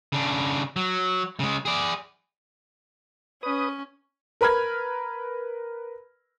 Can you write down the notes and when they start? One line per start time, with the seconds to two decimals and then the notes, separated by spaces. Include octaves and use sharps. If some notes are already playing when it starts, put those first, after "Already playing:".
0.13 C#3 D4
0.76 F#3
1.40 C#3 G#3
1.65 G#4 D5
3.43 C#4 B4 D#6
4.41 A#4 B4 B5 F6 G#6